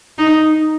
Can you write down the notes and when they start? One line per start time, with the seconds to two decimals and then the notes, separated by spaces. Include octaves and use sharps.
0.18 D#4